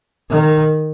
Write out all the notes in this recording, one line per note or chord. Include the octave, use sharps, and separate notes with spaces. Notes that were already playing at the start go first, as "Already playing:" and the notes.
D#3